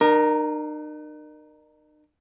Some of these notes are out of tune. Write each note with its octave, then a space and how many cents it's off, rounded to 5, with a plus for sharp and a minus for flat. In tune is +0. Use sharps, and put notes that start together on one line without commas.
D#4 -45 A#4 +5